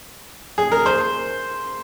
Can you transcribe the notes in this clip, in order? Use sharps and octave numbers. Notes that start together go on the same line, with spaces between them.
G#4
A#4
C5